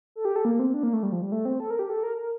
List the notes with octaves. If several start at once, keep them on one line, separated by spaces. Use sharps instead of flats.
A4
G4
A4
A#3
C4
D4
A#3
A3
G3
F3
G3
A3
C4
A4
A#4
G4
A4
A#4
A#4